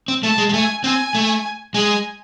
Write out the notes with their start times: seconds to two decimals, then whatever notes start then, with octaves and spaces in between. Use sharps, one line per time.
0.08 C4
0.23 A3 A5
0.38 G#3
0.49 G#3
0.54 A3 G#5
0.84 C4 G#5
1.15 A3
1.74 G#3 G#5